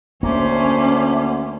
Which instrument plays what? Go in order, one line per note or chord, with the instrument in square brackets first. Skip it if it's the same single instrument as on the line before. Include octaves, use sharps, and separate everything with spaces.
[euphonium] D2 [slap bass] A#3 [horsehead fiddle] C#4 [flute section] C5 E5 D6